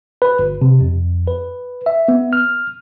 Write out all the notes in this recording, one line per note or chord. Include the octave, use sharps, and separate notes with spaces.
B4
G1
C3
F2
B4
E5
B3
F6